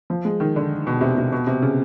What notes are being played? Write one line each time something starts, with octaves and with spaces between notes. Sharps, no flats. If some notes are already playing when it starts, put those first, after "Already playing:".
F3
G#3
D#3
D3
B2
C3
C3
B2
C3
C#3